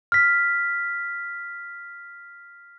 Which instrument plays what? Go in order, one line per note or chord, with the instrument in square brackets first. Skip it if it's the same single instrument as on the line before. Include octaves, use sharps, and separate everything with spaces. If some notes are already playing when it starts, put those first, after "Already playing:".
[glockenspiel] F6 B6